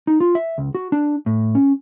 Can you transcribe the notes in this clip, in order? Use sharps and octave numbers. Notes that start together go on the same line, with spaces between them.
D#4
F4
E5
C#2
F#4
D4
A2
C#4